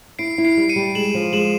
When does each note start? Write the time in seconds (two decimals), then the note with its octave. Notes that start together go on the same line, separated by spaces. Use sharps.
0.19 E4 C7 D7
0.38 E4
0.45 C7 D7
0.57 G3
0.69 C#7 D#7
0.76 G3
0.95 G#3 E7 F#7
1.15 F3
1.33 G#3 E7 F#7